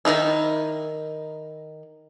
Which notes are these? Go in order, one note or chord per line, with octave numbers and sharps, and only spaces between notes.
D#3 F3 D#4 E4